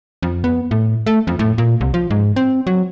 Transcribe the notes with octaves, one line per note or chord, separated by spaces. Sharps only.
F2
B3
A2
A3
F2
A2
A#2
C2
F3
G#2
C4
F#3